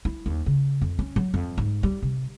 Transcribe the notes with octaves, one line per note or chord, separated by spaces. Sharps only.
E4
D#2
C#3
F2
C#4
F#3
F2
G#2
G3
C3